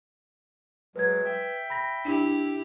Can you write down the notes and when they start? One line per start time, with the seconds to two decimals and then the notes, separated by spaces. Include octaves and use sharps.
0.96 F#3 G#3 B4 G#6
1.25 E5 G5
1.70 B5 A#6
2.05 D4 E4 G4